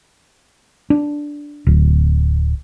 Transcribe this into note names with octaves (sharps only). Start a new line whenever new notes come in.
D4
D1